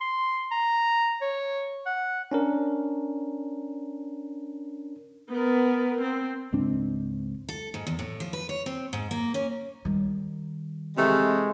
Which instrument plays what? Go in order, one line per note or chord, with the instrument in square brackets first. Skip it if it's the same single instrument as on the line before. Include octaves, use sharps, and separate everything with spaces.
[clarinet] C6
A#5
C#5
F#5
[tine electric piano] C#4 D4 A#4
[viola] B3 A#4
C4
[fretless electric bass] C#2 G#2 C4 D4
[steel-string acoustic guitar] A4
G#2
E2
A2
F3
B4
C#5
C4
G#2
A#3
C#4
[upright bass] D#3 G3
[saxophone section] C3 E3 A3 [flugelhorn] G#3